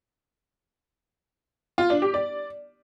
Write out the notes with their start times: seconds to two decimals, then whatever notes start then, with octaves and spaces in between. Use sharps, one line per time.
1.78 F4
1.90 D4
2.02 G4
2.14 D5